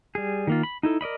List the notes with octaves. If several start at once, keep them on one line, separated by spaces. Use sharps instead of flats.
G3 G#4
D#3 A#3 F4
B5
D#4 E4 A4
A#4 D5 D#5 B5